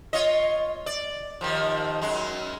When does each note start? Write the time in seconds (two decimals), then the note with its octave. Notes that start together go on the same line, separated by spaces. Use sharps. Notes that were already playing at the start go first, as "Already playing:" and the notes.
0.13 F4 C#5 D#5
0.86 D5
1.41 D#2 D#3 F3
2.02 F#2 G#3